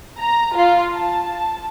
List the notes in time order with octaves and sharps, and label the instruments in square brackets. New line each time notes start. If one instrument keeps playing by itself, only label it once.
[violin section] A#5
F4
A5